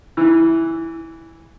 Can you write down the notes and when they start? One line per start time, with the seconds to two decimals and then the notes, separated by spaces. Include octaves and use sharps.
0.17 E3